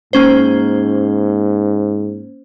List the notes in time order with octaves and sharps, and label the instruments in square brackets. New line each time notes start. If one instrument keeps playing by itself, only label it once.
[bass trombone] G#2 [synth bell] A#3 C#4 C5